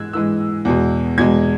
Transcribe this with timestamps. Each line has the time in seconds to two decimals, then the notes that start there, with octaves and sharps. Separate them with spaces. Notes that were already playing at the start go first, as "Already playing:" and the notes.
Already playing: G#2 E3 G#3 E6 F#6 G#6
0.13 G#2 E3 G#3 E6
0.65 E2 B2 G#3
1.18 E2 B2 G#3 G#6